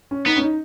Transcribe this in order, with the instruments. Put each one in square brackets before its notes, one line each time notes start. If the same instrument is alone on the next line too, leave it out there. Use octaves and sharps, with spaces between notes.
[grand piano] C#4
[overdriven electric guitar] B3 [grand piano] D#4
[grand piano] C#4
D#4